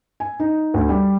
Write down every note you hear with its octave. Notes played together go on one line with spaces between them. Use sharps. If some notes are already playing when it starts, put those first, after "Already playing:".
G#5
D#4
D2
G3